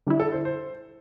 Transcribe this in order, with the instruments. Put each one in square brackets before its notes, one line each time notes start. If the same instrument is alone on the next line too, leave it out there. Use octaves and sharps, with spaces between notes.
[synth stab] D3 G3 E4
[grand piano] A4
C5
C5